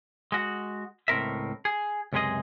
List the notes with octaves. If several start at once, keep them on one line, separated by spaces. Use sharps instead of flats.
G#3 F#4
C#2 A2 C4 A#4 E5
G#4
C#2 F#2 C3 G#3 G#4 D#5